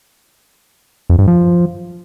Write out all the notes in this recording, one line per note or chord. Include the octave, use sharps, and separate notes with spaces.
F2
G2
F3